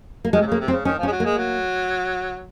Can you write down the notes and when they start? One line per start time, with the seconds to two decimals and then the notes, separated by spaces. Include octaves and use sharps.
0.25 A#3
0.33 D#3 G#3
0.41 C3
0.46 C#3
0.52 A#3
0.60 C3
0.68 C4
0.72 C#3
0.85 D#3 C#4
0.98 F3
1.03 C#4
1.07 G#3
1.12 F#3
1.20 G#3 A#3
1.38 F#3